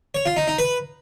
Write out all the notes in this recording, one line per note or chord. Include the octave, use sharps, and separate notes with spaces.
C#5
F4
D#4
D#4
B4